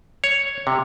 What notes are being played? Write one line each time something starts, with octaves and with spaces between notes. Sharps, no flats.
C#5
C3